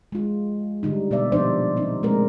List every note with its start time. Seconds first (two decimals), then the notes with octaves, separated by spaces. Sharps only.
0.12 G#3 F4
0.83 D3 G3 D#4
1.11 B2 A#3 B3 D5 E5
1.32 A#2 F3 D4 D#4 C5 D5
1.77 C4 D#4
2.03 G#3 A3 C4 A#4